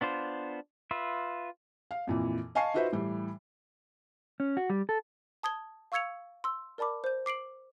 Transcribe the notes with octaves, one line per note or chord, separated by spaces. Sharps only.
B3 D4 F4 C5
F4 B4 E5
F5
F2 A#2 E3
D#5 F5 G#5 A5 C#6 C7
D#4 F4 F#4 B4 C5 E5
A2 E3 G3
C#4
F#4
G3
A4
A5 D#6 G#6 G7
F5 C#6 E6 G#6 C#7 F7
C6 E6
A#4 D5 A5 B5 D6
C5 G6
D6 C7 D7 F#7